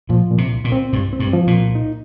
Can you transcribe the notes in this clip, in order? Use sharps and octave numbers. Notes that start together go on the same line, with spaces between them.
A#2 F3
A#2
C3
C2
A#2
C4
C2 G2
C4
G2
F3
A#2
C2
D#4